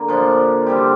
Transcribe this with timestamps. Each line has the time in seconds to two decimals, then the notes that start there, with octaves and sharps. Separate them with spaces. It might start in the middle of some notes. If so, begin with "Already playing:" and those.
Already playing: D3 A#3
0.08 A#2 F3 D4
0.66 D3 G3 C4 G4